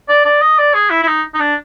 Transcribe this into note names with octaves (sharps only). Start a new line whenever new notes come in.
D5
D5
D#5
D5
G#4
E4
E4
D#4
D#4
D4